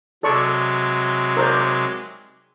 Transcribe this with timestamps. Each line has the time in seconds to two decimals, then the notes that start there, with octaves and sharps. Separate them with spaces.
0.23 C3 F#3 G#3 A4 D5 C#6
1.37 A#4 C5 D5